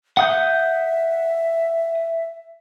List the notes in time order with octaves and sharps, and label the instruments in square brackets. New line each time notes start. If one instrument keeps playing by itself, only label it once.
[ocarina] E5 [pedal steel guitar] F#5 D#6 G6